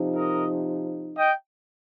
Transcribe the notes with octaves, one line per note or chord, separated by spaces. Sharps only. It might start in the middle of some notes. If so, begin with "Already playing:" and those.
Already playing: C3 F3 D#4
A#4 D#5
D#5 G5